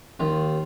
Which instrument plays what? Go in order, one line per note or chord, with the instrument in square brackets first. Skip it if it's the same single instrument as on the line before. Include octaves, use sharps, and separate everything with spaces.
[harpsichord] D#2 F4